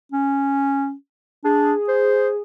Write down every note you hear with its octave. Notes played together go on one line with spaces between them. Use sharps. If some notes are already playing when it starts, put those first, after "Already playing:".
C#4
D4 G#4
C5